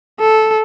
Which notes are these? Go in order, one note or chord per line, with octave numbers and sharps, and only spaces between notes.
A4